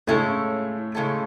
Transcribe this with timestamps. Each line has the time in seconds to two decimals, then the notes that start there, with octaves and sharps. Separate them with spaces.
0.07 A2 C#3 G#3 A3 C#4 E4 A4
0.95 C#3 G#3 C#4 E4 A4